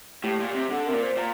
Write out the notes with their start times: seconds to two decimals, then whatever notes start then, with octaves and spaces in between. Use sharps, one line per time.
0.23 A2 G4
0.40 A#2
0.47 G4
0.54 C3
0.70 D3 A4
0.86 C3 A#4
0.94 A#2
1.02 C5
1.17 A#2 A#5